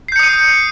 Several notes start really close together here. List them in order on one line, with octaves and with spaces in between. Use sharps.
C7 G6 C#7 D#6 D#7